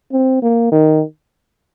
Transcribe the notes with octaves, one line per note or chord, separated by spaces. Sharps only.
C4
A#3
D#3